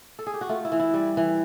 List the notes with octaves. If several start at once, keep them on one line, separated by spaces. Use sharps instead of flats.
A4
G#4
G4
F#4
A3 F4
E4
E3
E4
G3
E3